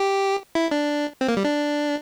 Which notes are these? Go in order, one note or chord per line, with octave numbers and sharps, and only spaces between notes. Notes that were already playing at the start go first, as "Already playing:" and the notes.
Already playing: G4
E4
D4
C4
A#3
G3
D4